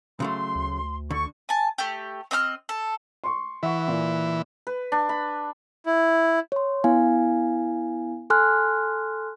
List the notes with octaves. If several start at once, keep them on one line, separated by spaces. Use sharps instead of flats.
C#3 F#3 A3 C6
D2
D3 C#6
G#5 A5
A3 G4
C4 D#5 F#5 F6
A4
C6 C#6
E3 E5 F#5 C#6
A#2
B4
D4
B5
E4
C#5 C6
B3 E4 F5 G#5
A4 G#5 C6 F6 F#6